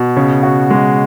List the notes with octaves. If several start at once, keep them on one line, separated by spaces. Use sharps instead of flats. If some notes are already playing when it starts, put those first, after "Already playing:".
Already playing: B2
C#3
F#4
G#3